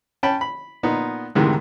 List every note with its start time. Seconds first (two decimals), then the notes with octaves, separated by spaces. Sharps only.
0.23 C#4 G5 A5 B5
0.41 B5
0.83 A#2 B3 D#4
1.35 D2 G#2 C3 D#3 E3